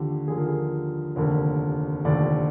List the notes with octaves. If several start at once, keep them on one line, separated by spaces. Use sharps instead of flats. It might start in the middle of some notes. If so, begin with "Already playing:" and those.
Already playing: D#2 D3 F3 G4
D#2 D3 F3 G#4
A#4
G#4
F1 D#2 D3 A#4
F1 D#2 D3 D5